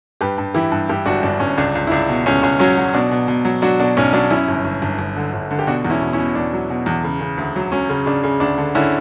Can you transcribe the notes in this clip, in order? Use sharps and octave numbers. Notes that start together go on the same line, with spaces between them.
G2 G4 B4
G2
E3 E4 G4
G2
G2 E4 G4
G1 D4 F#4
G1 D4
G1 C#4
C#2 D4
C#2
E4
C#2 D4
B2
C#2 C#4
C#2 C#4
F#3 C#4
F#3
B2 D4
B2
B2
F#3
F#3 D4 F#4
B2 D4
B1 C#4
F#3 D4
F#2 C#4 E4
G1
G1
G1
G1
D3
G1
D3
G4
B2 D4 F#4
E2
C#4 E4
B2
C#4 E4
B2
E2 D4
F#3
B2
E2
C#3
C#3
D2
F#3
F#3 C#4
C#3
C#3 D4
C#3
D2 D4
D3
D3 C#4 E4